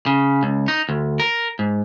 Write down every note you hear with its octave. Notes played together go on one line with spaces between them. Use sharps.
C#3
C#2
D#4
D2
A#4
G#2